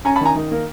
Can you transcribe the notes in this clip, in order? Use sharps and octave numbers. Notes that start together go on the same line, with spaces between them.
C#4 G#5 A#5
A5 B5
D#3 G#5 A#5
D#3
A#3